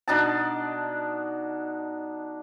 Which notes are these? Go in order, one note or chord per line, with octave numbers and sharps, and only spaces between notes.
B2 D4 D#4 A5